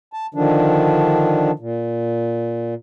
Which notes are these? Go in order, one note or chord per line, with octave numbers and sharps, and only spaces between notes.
A5
D3 D#3 F3 D4
A#2